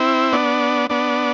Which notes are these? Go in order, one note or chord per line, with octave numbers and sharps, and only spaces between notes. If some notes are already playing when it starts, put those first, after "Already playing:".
Already playing: C4 E4
B3 D4
B3 D4